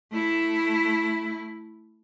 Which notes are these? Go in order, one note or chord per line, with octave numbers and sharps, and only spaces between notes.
A3 E4